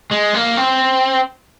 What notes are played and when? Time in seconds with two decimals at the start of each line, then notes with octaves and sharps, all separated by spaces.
0.11 G#3
0.34 A#3
0.57 C4